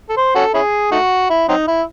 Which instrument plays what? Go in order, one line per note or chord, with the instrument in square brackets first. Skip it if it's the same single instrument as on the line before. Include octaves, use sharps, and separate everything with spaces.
[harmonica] A4
C5
C#4 F#4 A4
C#4 E4 G#4
A3 D#4 F#4
E4
F#3 C4 D#4
E4